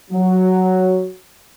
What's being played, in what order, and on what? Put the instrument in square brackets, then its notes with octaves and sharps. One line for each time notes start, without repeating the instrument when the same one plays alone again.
[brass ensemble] F#3